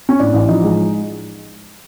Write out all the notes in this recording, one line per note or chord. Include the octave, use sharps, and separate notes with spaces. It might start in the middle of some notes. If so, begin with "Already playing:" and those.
C#4
A2 D4
A1
F3 D#4
G#3